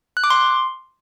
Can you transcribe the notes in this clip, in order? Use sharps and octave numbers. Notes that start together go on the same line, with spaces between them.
F#6
D6
C6